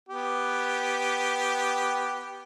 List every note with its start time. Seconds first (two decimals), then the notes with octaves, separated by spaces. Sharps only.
0.09 B3 G4